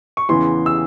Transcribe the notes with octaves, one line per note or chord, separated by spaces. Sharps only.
C#6
E2 C#3 E3 C6
E6